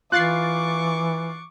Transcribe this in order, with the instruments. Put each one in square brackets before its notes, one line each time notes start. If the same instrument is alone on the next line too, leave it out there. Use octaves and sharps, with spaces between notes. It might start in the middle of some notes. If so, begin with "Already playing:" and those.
[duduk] E3 [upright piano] F4 [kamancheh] C#6 D6 [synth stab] F#6 A6 C7